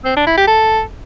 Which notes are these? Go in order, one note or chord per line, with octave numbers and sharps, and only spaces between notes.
C4
D4
E4
G4
A4